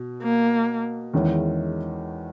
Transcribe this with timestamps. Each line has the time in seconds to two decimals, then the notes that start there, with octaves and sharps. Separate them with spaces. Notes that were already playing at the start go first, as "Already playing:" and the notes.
Already playing: B2
0.22 A#3
1.14 E2 D#3 G#3 C#4 E4